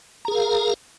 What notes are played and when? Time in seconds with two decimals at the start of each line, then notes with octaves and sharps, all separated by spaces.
0.25 A#5
0.28 G#4
0.31 A#4
0.35 F5